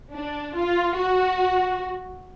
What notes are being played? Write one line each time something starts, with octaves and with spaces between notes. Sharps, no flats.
D4
F4
F#4